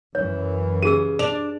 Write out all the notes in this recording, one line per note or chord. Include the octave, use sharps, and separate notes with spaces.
F#2 E3 C#5
C#3 G4 G#4 E6 D#7
D4 D5 F7